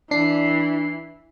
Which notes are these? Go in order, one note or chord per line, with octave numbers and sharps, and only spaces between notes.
E3 D4 C7